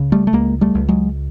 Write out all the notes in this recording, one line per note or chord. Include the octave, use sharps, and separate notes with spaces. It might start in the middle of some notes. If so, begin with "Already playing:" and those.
Already playing: C#2 C#3
G3 A3
A3
C#2 G#3 A#3
G3 A3
C#2
F#3 G#3